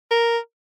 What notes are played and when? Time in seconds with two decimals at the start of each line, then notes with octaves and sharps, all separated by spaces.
0.11 A#4